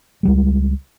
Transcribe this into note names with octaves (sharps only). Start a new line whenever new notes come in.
C#2 G3 G#3